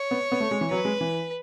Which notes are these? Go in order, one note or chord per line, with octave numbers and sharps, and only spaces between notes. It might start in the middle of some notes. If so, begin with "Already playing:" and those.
Already playing: C#5
B3
B3
A3
G#3
E3
F#3 B4
G#3
E3